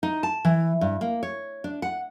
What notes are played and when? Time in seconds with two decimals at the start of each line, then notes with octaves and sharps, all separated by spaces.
0.03 D#4
0.23 A5
0.45 E3
0.81 G2
1.01 A#3
1.23 C#5
1.64 D4
1.82 F#5